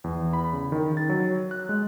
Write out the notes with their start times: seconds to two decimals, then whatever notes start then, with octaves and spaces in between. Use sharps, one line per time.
0.04 E2
0.33 B5
0.53 C#3
0.72 D#3
0.97 A6
1.09 F#3
1.51 F#6
1.69 G#3